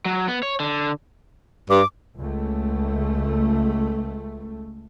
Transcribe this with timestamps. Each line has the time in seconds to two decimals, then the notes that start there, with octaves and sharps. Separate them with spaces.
0.06 F#3
0.28 B3
0.43 C#5
0.60 D3
1.70 G2 D6
2.19 C#2 A3